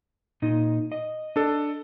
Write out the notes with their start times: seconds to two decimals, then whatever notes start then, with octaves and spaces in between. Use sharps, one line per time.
0.42 A#2 D#4 D#5
0.92 D#5
1.36 D4 A4